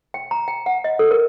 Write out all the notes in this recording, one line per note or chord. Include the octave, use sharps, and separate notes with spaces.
G5
A#5
G5
F#5
D#5
A4
A#4